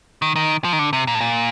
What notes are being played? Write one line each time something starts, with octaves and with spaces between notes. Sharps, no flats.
D#3
D#3
F3
D#3
D3
C3
A#2
A2
A#2